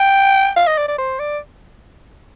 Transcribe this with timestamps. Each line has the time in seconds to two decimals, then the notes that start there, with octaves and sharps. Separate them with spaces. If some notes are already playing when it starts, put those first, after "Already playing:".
Already playing: G5
0.57 F5
0.67 D#5
0.78 D5
0.88 D5
0.98 C5
1.19 D5